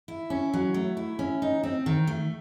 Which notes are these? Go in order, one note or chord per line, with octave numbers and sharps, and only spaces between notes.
E4
C#4
F#3
A3
E4
C#4
D#4
C4
D#3
A3